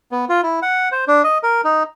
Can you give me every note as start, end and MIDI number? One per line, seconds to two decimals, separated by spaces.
0.12 0.25 59
0.29 0.41 65
0.43 0.60 64
0.62 0.89 78
0.92 1.05 72
1.08 1.22 62
1.24 1.38 75
1.43 1.61 70
1.65 1.83 63